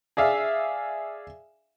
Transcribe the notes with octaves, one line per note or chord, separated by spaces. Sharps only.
G#4 D5 E5 F5